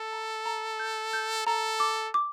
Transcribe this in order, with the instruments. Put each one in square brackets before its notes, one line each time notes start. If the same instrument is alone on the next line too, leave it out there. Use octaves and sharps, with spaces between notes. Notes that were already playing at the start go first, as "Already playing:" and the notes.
Already playing: [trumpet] A4
[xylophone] A#5
A#5
G6
G6
[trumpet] A4 [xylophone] A#5
[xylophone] D6
D6